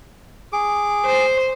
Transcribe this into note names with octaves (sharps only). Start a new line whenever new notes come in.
G#4 D6
C5